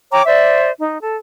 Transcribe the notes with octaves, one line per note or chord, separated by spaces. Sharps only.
C#5 G5 A#5 D6
C5 D5 E5
D#4
A4